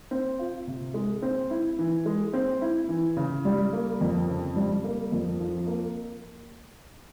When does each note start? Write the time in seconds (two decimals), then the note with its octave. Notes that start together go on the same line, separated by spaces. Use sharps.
0.11 C4
0.39 F4
0.67 C3
0.94 G#3
1.22 C4
1.50 E4
1.79 E3
2.06 G#3
2.33 C4
2.61 E4
2.89 E3
3.17 C#3
3.45 G3
3.73 A#3
4.01 F2
4.28 C#3
4.56 G3
4.84 A#3
5.12 F2
5.40 F3
5.67 A#3